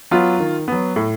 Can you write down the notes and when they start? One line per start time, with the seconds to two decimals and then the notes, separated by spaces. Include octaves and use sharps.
0.11 F#3 B3 F4
0.40 D#3
0.68 F#3 B3
0.96 A2